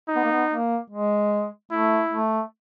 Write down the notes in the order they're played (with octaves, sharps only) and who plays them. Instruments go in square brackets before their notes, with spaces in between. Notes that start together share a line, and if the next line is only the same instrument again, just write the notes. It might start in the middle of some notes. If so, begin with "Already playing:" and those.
[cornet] D#4
[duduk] B3
A#3
B3
A#3
G#3
[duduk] A3 [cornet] E4
[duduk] A3